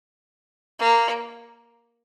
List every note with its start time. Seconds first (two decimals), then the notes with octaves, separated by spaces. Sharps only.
0.80 A#3